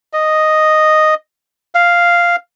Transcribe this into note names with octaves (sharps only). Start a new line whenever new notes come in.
D#5
F5